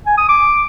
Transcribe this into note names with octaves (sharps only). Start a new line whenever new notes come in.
G#5
D#6
D6